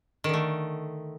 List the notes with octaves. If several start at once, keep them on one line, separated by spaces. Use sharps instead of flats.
D3 D#3 A3